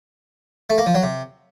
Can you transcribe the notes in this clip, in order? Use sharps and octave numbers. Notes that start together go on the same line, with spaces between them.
A3
A#3
F3
F#3
C3